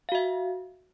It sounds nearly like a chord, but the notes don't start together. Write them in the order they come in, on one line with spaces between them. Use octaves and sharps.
F5 F#4 E5